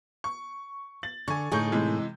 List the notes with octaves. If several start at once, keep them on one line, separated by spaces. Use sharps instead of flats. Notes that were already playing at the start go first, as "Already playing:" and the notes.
C#6
A6 F#7
D3 G#5 C#6
A2 D3 D#4 G#4 C#6 G6
C3 E3 G#3